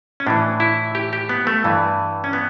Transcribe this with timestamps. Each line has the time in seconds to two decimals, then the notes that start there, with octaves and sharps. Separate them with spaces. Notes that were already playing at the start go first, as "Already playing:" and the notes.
0.20 C#4
0.27 A2 E3 D4
0.60 E4
0.95 G4
1.13 G4
1.29 B3
1.47 A3
1.64 G2 E3
2.24 C#4
2.33 B3